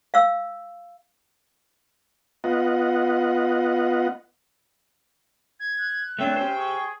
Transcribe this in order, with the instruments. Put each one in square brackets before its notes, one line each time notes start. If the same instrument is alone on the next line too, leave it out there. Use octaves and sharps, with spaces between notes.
[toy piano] F5 E6
[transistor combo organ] B3 F4 D#5 F#5
[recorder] G#6
[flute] F#6
[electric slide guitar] A3 C4 D4 [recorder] C#5 [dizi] G5
[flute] C#4 [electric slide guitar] G4 C5
[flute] G#4 [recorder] C#6